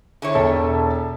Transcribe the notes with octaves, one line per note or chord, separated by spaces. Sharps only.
D3 E4 C#5
E1 A4 E5